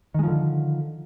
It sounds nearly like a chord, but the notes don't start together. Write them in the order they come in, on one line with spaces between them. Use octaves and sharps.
D#3 G#3 F3 D3